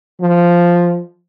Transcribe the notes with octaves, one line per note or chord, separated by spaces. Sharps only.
F3